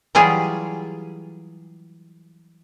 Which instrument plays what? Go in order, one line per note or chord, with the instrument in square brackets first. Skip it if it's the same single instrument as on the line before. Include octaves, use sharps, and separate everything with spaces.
[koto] E3 F#3 G3 F4 G4 G#4